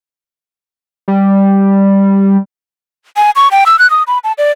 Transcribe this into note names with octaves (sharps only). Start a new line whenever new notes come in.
G3
G#5
C#6
G5
E6
F#6
D#6
B5
A5
D5